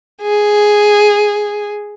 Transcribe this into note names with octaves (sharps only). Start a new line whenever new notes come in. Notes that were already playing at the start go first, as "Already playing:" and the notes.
G#4